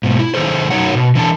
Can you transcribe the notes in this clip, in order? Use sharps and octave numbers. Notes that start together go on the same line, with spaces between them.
G#2 B2
E4
D#3 G#3 G#4 A4 C5
F#2 D#3 F#3 D#4 C#5 F#5
B2
E3 D4 A5